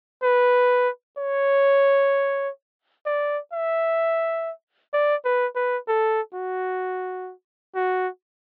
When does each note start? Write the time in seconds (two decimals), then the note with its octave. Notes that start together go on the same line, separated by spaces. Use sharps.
0.23 B4
1.18 C#5
3.06 D5
3.53 E5
4.93 D5
5.25 B4
5.55 B4
5.88 A4
6.34 F#4
7.75 F#4